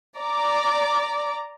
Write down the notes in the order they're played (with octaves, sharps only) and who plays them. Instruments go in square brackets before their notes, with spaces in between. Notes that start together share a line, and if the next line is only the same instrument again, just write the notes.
[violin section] D5 A#5 D6